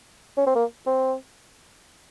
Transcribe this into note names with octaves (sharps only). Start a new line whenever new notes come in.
C#4
C4
A#3
C4